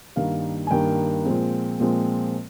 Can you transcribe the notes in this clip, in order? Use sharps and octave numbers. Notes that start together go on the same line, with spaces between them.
G2 D#3 A#3 F5
G#5
G2 D#3 A#3 G5
A#2 F3 G#3 C4
A#2 F3 G#3 C4